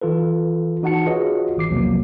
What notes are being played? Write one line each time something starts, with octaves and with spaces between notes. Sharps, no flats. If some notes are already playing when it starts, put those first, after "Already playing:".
E3 F4 A4 B4
E3 D#4 F#4 F#5 A5 C#7
F4 F#4 G#4 B4 C#5 D#5
G#1 E3 D6 C7
B1 E2 C3 F3 F#3 A#3